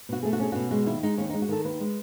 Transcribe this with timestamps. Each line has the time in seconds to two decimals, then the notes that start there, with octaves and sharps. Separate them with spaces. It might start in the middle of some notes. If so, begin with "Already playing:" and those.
0.09 B2 F#4
0.23 A3 G#4
0.33 F#4
0.40 C#4 G#4
0.52 B2 F#4
0.71 G#3 F#4
0.86 D#2 E4
1.03 G#3 D#4
1.18 D#2 C#4
1.30 D#4
1.34 G#3
1.42 F#4
1.49 D#3 A4
1.65 D#2 B4
1.80 G#3